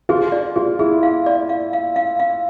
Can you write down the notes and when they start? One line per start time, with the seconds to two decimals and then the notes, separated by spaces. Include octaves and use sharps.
0.09 F4 G#4
0.32 D5
0.56 F4 G#4
0.79 E4 G#4
1.03 F5
1.26 D5
1.49 F5
1.73 F5
1.96 F5
2.19 F5